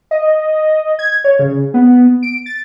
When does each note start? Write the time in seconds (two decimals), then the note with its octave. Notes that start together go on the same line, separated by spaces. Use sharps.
0.11 D#5
0.99 G#6
1.24 C#5
1.39 C#3
1.74 B3
2.23 D7
2.46 A6